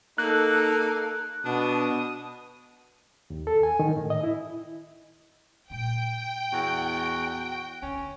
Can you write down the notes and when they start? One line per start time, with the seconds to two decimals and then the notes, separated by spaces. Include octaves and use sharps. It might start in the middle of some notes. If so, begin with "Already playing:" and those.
0.18 A#3 D#4 A4 F#6
1.45 B2 D4 D#6
3.30 D#2
3.47 A4
3.63 G#5
3.80 D#3
3.96 A2
4.10 D#5
4.24 E4
5.70 A#2 G#3 G5
6.53 E2 F#4
7.82 D2 C#4